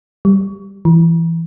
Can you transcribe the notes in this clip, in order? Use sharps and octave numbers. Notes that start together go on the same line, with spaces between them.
G3
E3